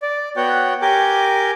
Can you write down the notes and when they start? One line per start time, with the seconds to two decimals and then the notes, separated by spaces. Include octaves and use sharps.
0.02 D5
0.36 B3 F#4 C#5 F#5 G5
0.82 G4 A#4 G#5 D6 G6